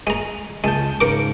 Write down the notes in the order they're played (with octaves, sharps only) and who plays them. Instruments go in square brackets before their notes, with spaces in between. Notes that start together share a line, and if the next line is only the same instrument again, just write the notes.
[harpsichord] G#3 A#5
[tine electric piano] C#2 A5 G6 [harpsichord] G#3
[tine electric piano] G#2 C#3 C#7 [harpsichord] A#4 D6